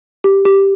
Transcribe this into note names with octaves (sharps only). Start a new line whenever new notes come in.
G4
G4